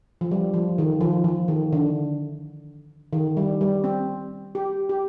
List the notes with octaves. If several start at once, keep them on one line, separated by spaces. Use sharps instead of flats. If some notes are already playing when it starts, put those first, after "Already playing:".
F3
G3
F3
D#3
F3
F3
D#3
D3
D#3
G3
G3
C4
G4
G4